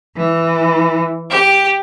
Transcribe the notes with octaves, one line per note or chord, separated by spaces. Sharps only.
E3
G4